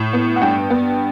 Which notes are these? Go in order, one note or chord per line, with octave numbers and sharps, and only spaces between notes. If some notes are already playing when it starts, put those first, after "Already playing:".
Already playing: A2
B3
F#5
G2 G5
B3